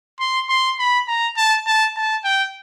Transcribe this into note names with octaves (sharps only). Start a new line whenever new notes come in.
C6
C6
B5
A#5
A5
A5
A5
G5